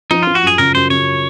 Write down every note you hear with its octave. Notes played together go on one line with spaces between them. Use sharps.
F3 D#4
F3 F4
F#4
F#2 G#4
C#3 A#4
F#2 C5
C#3 C#5